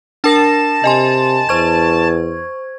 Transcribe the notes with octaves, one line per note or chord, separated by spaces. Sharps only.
D4 A#4 A5 A#6
C3 D#5 G#5 C6
E2 C5 C#6 G#6